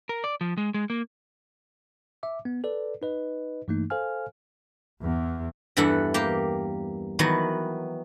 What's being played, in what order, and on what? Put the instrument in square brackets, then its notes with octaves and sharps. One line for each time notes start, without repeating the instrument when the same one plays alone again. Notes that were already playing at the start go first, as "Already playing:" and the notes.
[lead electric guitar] A#4
D5
F3
G#3
G#3
A#3
[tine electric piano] E5 D6
B3
A4 B4 D5
D#4 B4 D#5
G2 E3 A3 A#3 D#4
A4 C5 F5 G#5 F6
[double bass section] E2
[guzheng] E2 G2 E3 A4 F#5
A#3 G4
D#3 E3 F#3 B3